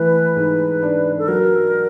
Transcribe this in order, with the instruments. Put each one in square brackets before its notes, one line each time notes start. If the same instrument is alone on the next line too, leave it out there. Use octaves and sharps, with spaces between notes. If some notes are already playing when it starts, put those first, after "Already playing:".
Already playing: [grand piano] E3 A3 [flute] B4
[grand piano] G#2
D4
[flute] A4
[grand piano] F#3 [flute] A#4